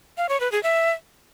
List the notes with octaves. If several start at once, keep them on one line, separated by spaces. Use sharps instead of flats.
F5
C#5
B4
G#4
E5